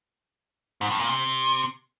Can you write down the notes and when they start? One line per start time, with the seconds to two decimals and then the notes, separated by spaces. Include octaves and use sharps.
0.81 G#2
0.90 G2
1.00 A#2
1.09 C3